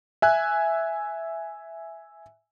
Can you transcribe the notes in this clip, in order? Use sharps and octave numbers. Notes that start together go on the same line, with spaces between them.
E5 G#5 F#6